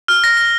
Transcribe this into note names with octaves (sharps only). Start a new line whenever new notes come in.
F6
A#6
A#6